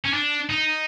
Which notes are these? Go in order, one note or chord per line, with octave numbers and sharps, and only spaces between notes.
C#4
D4
D#4